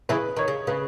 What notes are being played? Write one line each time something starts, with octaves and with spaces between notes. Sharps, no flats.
C#3 E3 B4
D#3 C#5
C#3
C#3 B4